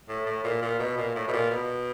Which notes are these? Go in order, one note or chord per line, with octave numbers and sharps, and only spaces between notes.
A2
A2
A#2
A#2
B2
A#2
A2
B2
A#2
B2